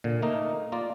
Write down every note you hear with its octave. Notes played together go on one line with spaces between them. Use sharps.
A#2 D3
A3 A#3 D#4 A#4
A#3 F4 A#4 D5